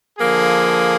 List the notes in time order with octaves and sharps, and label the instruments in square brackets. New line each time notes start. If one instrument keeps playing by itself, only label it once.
[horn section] D3 F3 A#3 G#4